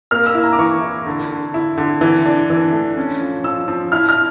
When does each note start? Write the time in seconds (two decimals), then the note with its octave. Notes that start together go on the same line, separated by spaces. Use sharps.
0.11 A#3 F6
0.26 E6
0.35 E4
0.43 A#5
0.53 D6
0.59 E3 C#6
0.82 E4
1.06 D3
1.30 D3
1.54 E4
1.78 D3
2.01 E3
2.26 D4
2.50 E3
2.72 A3
2.97 C#4
3.21 F3
3.44 F3 E6
3.68 F3
3.92 E4 F6
4.09 F6